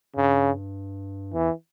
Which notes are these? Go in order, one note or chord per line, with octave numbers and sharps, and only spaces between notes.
G2 C#3
E2 E3